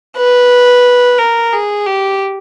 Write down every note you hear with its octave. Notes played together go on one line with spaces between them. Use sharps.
B4
A#4
G#4
G4